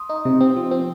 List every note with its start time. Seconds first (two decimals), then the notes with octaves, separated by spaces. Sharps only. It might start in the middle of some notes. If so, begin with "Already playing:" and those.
Already playing: C6 D#6
0.10 D#4
0.25 C3
0.41 C4
0.56 F3
0.71 C4